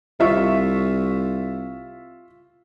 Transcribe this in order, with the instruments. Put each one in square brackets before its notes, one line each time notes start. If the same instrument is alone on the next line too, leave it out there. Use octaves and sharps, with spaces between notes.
[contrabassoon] C2 [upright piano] F4 E5 C#6